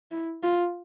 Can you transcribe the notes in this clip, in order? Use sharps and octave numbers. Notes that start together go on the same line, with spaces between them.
E4
F4